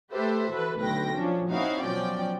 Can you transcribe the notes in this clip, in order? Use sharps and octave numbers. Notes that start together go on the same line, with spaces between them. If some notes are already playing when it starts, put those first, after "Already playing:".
A3 G4 A4 B4 C5 E5
E3 F#4 A4 B4
B1 D3 A3 B4 G5 A#6
F3 C#4 D4
C4 C#4 D#4 E4 F#4 F5
B2 F3 F#3 C#4 D5 G5